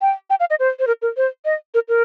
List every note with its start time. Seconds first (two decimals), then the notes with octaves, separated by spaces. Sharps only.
0.02 G5
0.30 G5
0.40 F5
0.50 D#5
0.60 C5
0.79 C5
0.87 A#4
1.02 A#4
1.17 C5
1.45 D#5
1.74 A#4
1.89 A#4